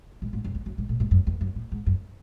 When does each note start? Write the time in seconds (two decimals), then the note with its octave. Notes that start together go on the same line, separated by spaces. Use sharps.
0.22 G#2
0.33 G#2
0.44 F#2
0.55 E2
0.66 F#2
0.78 G#2
0.89 A2
1.00 G#2
1.11 F#2
1.27 E2
1.41 F#2
1.56 A2
1.72 G#2
1.86 F#2